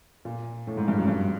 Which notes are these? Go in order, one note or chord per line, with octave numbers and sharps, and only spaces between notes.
A#2
A2
G#2
G2
F#2
G2